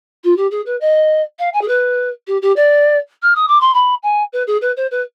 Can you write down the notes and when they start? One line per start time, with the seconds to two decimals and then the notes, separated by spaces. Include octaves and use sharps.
0.24 F4
0.36 G4
0.51 G#4
0.66 B4
0.80 D#5
1.39 F5
1.53 G#5
1.61 G#4
1.68 B4
2.27 G4
2.42 G4
2.56 D5
3.22 F6
3.35 D#6
3.48 D6
3.60 C6
3.74 B5
4.03 G#5
4.33 B4
4.47 G#4
4.61 B4
4.76 C5
4.91 B4